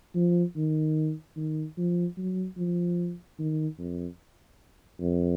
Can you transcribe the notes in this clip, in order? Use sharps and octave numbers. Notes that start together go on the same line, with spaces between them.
F3
D#3
D#3
F3
F#3
F3
D#3
F2
F2